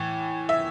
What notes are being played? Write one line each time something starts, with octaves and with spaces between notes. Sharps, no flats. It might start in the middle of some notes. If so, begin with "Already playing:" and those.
Already playing: A2 E3
E5